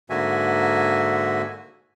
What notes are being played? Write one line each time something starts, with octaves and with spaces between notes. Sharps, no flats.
G#2 D3 A#3 F#4 E5 G#5